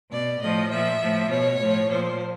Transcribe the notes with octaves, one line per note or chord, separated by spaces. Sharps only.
B2 D5
A2 F3 D#5
A#2 F3 E5
A2 F3
B2 C#5
A2 F3
A#2 F3 C5